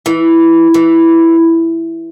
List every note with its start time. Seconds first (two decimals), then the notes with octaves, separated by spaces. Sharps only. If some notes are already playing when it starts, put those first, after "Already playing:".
0.06 E3
0.74 E3